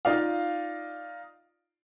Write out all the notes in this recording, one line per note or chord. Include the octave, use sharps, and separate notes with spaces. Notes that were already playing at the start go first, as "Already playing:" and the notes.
D#4 F4 D5 F5